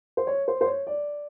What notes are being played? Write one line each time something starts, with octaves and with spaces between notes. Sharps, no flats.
C5
C#5
C5
C5
C#5
D5